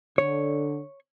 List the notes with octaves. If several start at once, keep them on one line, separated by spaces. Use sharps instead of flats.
D3 C#5